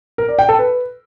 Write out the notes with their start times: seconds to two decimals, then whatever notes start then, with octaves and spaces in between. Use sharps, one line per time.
0.18 A#4
0.28 D5
0.39 G5
0.49 A4
0.59 B4